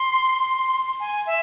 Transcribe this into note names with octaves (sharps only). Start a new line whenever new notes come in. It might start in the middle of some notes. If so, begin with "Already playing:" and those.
Already playing: C6
G#5
E5